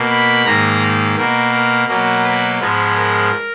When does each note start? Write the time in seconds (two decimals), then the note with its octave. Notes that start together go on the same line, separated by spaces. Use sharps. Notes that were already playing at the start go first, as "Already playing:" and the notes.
Already playing: B2 A#3
0.10 B5
0.45 G#2 D#3 A#3 A#5
1.16 B2 A#3 A#4
1.52 A#4
1.87 B2 F#3 A#3 A#4
2.24 B4
2.60 G#2 F3 G#3 B3
2.95 A#4